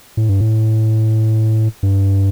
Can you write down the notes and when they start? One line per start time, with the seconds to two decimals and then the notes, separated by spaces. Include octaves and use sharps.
0.17 A2
0.29 G2
0.40 A2
1.83 G2